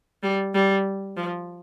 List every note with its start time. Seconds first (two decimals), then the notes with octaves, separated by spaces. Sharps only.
0.23 G3
0.54 G3
1.17 F3